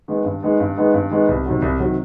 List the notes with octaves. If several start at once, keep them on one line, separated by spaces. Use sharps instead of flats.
D#3 G#3 B3 D#4
G2
D#3 G#3 B3 D#4
G2
D#3 G#3 B3 D#4
G2
D#3 G#3 B3 D#4
C2
C3 D#3 F#3
C2
C3 D#3 F#3